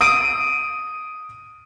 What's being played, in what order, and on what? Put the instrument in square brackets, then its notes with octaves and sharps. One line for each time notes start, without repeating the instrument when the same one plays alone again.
[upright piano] D#6 D7 D#7